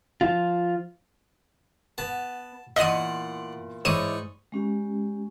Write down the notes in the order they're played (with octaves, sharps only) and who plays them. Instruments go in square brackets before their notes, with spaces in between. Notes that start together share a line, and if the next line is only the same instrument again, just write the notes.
[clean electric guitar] F3 F4
[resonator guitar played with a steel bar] B3 [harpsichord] A5
[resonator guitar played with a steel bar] E2 A#2 [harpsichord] D5 F#5 C6 [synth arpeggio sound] D#5 D#7
[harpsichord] G#2 C#6 D#6 [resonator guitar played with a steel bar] E3 C#5 D5 [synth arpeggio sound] D#7
[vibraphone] G#3 C#4 G4